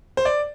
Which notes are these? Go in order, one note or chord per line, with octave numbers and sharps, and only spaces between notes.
C5
D5